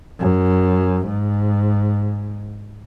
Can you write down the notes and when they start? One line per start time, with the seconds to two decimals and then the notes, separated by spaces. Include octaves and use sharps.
0.20 F#2
1.07 G#2